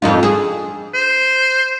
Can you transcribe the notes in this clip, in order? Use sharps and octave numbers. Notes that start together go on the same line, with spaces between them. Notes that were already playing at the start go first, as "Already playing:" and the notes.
F2 D#4 F4
G#4
C5